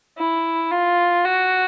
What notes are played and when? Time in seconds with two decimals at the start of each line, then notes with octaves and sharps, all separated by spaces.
0.18 E4
0.71 F4
1.25 F#4